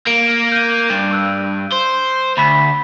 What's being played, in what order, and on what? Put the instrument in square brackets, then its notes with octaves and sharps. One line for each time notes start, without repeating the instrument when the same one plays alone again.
[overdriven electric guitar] A#3 [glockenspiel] D7
[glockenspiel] G6 D#7
[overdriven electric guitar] G2
[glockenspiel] C#6 E6 F#6
[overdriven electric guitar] C5
[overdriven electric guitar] D2 [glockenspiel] B5 B6